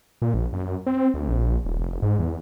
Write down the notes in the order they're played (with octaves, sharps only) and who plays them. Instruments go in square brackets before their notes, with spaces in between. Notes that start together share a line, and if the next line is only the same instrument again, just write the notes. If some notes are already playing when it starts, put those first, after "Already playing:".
[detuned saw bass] A#2
A#1
F#2
C4
D2
A#1
D#1
F1
G#2
E2